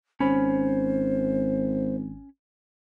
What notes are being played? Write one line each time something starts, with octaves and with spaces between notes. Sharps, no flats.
G#1 C#4 C5 B5